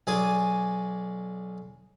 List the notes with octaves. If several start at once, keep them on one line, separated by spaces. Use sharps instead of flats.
B1 G#4 D5 G#5